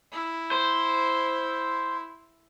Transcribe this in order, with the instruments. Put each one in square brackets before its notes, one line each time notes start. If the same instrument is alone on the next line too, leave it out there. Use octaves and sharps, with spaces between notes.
[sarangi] E4
[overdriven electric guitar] C5